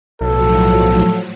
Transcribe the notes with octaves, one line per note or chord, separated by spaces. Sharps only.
B1 A2 F3 F#3 A4